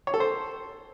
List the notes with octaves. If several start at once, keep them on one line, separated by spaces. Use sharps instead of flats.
C#5
A4
C5